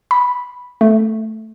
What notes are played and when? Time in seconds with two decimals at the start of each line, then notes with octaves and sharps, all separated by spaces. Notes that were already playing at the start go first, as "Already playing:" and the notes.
0.11 B5
0.81 A3